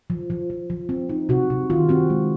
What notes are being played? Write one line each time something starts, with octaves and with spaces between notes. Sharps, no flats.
F3
F3
F3
F3
C4
D#4
C3 F#4
C3
D#3 F4
C4 F#4
G#3